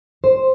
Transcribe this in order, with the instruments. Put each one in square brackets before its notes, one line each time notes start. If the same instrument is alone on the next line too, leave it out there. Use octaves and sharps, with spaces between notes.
[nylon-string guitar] C5